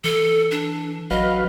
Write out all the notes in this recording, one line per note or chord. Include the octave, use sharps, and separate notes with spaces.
E3 A4
D4
A1 F#3 B4 D#5 F5